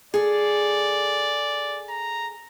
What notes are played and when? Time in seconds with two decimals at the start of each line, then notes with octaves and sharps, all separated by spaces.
0.14 G#4 A4 D5
1.89 A#5